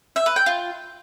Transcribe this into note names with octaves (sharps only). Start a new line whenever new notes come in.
E5
B4
G5
F4